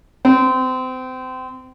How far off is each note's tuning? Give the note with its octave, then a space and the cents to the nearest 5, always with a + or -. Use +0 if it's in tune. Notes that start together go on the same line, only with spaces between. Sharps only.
C4 -30